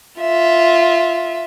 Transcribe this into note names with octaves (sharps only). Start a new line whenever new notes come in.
F4 E5